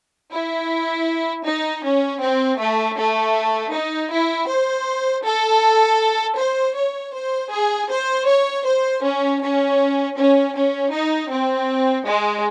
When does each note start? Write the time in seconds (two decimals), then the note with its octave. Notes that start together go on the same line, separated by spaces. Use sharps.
0.32 E4
1.45 D#4
1.84 C#4
2.21 C4
2.59 A3
2.97 A3
3.72 D#4
4.11 E4
4.48 C5
5.24 A4
6.38 C5
6.76 C#5
7.14 C5
7.51 G#4
7.90 C5
8.28 C#5
8.66 C5
9.04 C#4
9.41 C#4
10.17 C#4
10.55 C#4
10.93 D#4
11.31 C4
12.07 G#3